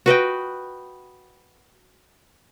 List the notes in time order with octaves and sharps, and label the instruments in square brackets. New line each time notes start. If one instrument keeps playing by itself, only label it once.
[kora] F#4 B4 D#5 G5